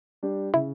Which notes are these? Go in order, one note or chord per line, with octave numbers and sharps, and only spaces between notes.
G3 D4 G4
C#3 E4